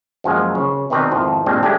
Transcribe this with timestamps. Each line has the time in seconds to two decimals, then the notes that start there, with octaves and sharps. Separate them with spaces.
0.24 F#2 F3 G#3 A#3
0.55 C#3
0.90 B2 D#3 C4 B4 D5 A#5
1.11 G#1 F2 F3 E4 A4
1.46 G2 A#2 G#3 A#3 C4 D4
1.63 G#3 A3 C#4 D4 G4